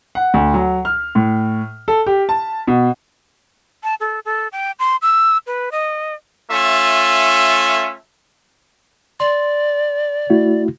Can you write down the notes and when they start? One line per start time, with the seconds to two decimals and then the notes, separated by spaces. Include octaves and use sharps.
0.15 F#5
0.34 D2
0.54 F#3
0.85 F6
1.15 A2
1.88 A4
2.07 G4
2.29 A5
2.68 B2
3.84 A5
4.00 A4
4.25 A4
4.52 G5
4.79 C6
5.02 E6
5.47 B4
5.72 D#5
6.50 A3 C#4 F4 E5
9.20 D5 C6
10.30 A3 E4 F#4